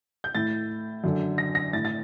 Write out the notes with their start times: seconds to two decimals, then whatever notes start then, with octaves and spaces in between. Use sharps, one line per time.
0.24 G6
0.35 A2 A6
1.04 F#2 D3
1.38 A#6
1.55 A#6
1.73 A2 A6
1.85 A6